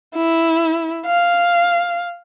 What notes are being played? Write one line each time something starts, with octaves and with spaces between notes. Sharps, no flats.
E4
F5